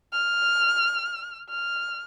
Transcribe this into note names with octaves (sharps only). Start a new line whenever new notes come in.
F6
F6